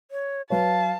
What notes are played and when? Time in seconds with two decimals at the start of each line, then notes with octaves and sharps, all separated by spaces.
0.11 C#5
0.50 F#3 B4 C#5 F5 A5